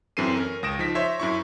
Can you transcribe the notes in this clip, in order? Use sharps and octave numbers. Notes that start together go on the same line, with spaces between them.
F#2 E3 C4 A4 C7 D#7
C#4 A#4
C#2 D#6 A#6 D7 E7
F3 D#4 B6
C5 C#5 E5
F#2 E4 C#6